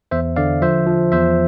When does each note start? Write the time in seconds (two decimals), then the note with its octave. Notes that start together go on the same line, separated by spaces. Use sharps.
0.11 E2 C5 E5
0.36 D3 D5 F5
0.62 F3 C5 E5
0.87 F3
1.12 E2 C5 E5